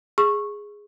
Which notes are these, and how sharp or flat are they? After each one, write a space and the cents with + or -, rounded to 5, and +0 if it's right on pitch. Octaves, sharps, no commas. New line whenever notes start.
G#4 -5 C#6 -10